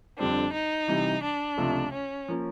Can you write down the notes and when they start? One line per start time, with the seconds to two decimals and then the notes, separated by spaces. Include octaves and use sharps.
0.19 F2 D3 G3 C4 D4
0.53 D#4
0.88 C3 E3 G3
1.23 D4
1.58 C#2 C3 F3 A3
1.92 C#4
2.28 F3 A#3 C#4